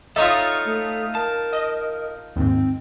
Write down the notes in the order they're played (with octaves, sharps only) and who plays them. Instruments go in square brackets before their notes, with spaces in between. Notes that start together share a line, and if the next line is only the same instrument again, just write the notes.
[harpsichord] D#4 F4 [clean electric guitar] A4 C#5 [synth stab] E5 D#6
[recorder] A3
[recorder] A#4 [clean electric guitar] A5
[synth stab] D#5
[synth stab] D#2 G#2 [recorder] C4